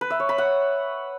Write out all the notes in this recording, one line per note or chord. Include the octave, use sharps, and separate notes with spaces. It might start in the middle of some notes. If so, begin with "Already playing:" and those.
B4
E5
C#5
B5
F#5